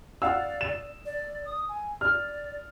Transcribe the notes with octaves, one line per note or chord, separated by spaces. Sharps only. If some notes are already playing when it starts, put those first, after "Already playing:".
D5 F5 F#5 E6
E7
D5
D#6
G#5
D5 F6